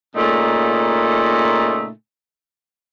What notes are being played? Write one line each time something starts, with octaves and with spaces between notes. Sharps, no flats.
A#2 C#3 A3 D#4